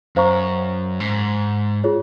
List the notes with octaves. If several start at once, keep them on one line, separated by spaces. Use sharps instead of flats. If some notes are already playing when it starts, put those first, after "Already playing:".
F#2 C5 F5 A#5 C#6
G#2
F4 G#4 C#5